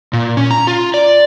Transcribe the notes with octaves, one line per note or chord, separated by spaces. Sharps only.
A#2
C#4
A#5
F4
D5